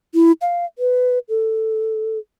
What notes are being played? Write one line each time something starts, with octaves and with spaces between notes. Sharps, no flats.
E4
F5
B4
A4